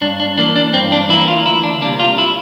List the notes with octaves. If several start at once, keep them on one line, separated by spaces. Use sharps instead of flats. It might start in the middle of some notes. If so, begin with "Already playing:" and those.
G2 D4
D4
E3 A#3 D4
D4
G2 C4
D4
E3 A#3 E4
F4
D2 E4
D4
C3 G3 A#3 D4
F4
E4